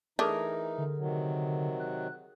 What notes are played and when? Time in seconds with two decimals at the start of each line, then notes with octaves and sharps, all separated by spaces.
0.19 E3 A3 D4 D#4 G#4 A#4
0.78 D3
0.97 C3 D#3 F#3
1.80 F#6